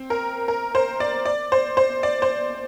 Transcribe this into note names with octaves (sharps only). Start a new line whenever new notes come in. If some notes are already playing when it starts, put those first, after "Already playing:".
Already playing: C4
A#4
A#4
C5
D5
D5
C5
C5
D5
C5